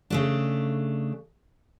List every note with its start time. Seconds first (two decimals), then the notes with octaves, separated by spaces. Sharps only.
0.10 C#3 A3 D4